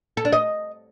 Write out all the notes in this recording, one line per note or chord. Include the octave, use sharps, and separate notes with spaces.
A4
D4
D#5